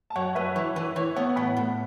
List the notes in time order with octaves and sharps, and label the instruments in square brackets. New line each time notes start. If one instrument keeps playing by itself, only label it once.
[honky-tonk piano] A5
[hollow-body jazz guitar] F#2 [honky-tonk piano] C#5 F#5
[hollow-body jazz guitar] F#2 [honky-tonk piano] B4 E5
[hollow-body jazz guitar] E3 [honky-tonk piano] C#5
[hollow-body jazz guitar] E3 [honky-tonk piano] B4
[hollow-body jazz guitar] E3 [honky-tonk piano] C#5
[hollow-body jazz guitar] B3 [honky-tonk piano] C#5 F#5
[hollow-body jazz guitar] A2 [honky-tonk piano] F#5 B5
[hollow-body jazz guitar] A2